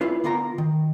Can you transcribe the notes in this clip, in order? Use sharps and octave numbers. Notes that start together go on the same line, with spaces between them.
E4 F4 B4
D3 B3 F4 A#4 G5 A#5
D#3